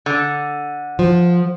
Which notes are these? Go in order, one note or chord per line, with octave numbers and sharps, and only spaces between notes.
D3
F3